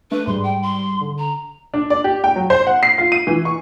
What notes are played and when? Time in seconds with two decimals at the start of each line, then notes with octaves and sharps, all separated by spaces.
0.11 A3 D4 B4
0.27 G#2 G3 C6
0.43 G5
0.62 C6
1.01 D3
1.19 A#5
1.74 D4
1.90 D5
2.04 G4
2.24 G5
2.36 F#3
2.50 C5
2.67 F#5
2.83 C7
2.98 F4
3.12 D#7
3.27 E3
3.45 C#6